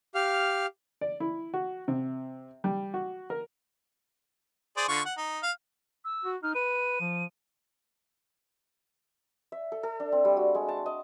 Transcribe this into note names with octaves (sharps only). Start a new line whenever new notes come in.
G4 F5 F6
D5
E4
F#4
C3
G3
F#4
A#4
G#4 C5 D5
D3 F4 C#6
F#5
D#4
F5
E6
F#4
D#4 F6
B4 D#7
F3
E5
A4
A4
D4
C4
G3
F#4
G#3
A5
D#5